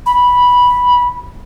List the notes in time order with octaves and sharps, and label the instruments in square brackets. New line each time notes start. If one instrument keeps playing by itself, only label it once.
[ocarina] B5